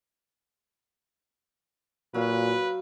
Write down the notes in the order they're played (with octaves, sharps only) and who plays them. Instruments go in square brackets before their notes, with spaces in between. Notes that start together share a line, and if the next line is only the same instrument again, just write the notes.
[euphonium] A#2 [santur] F#3 F5 [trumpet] B4